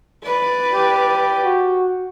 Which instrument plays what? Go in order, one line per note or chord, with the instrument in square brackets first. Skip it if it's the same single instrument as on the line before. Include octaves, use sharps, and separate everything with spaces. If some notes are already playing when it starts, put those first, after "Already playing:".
[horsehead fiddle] B4 D5
[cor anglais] G4
[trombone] F#4